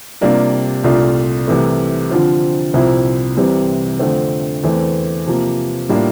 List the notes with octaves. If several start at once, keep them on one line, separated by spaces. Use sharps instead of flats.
C3 G3 A#3 D4 F4
C2 A#2 A3 D4 F4
C2 C3 E3 A3
D3 F3 C4 F4
C2 A#2 F3 C4 E4
C2 C3 E3 G3 C4
F2 D3 A3 C4
E2 E3 A3 C4
C3 F3 A#3
A2 G3 A#3 D4 F4